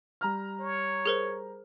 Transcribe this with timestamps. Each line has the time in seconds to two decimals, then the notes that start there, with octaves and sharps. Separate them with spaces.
0.21 G3 A#5 F6
0.60 C#5
1.06 G#4 A#4 C5